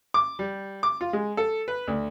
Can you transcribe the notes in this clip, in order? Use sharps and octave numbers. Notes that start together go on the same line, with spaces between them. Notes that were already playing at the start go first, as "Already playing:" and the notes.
D6
G3
D6
F4
G#3
A4
B4
D2